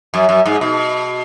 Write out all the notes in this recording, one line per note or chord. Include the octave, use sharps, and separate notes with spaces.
F#2
F#2
G#2
B2